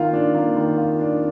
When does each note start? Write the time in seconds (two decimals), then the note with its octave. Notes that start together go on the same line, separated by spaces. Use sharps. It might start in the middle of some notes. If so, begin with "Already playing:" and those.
Already playing: D#3 A#3 F4
0.13 D4
0.35 A#3
0.56 D#3
0.77 F4
0.99 D4